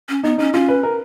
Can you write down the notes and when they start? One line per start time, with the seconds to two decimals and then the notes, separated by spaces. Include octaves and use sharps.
0.09 C#4
0.24 B3 D#4
0.38 C#4 D#4
0.54 C#4 F4
0.68 B4
0.83 A#4